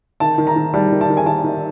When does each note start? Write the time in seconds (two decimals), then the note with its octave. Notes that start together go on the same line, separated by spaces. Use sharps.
0.20 D#3 A5
0.38 D#3
0.47 A#5
0.56 D#3
0.74 G3 A5
0.92 D#3
1.01 A5
1.10 D#3
1.17 G#5
1.26 D#3 A5
1.44 D#3